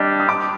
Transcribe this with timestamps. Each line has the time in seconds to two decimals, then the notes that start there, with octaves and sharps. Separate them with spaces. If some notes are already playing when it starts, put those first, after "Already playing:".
Already playing: G3 D4 G4 D5 D#5
0.20 D#6
0.29 D6